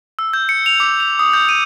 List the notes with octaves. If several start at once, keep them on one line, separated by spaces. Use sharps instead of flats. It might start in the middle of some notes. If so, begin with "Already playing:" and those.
E6
G6
C#7
F7
D6
F7
D#6
G6
D#7